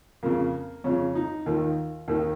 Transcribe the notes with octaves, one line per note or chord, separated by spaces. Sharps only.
F2 C#3 A#3
F2 C#3 C#4
D#4
D#2 D#3 F4
D#2 D#3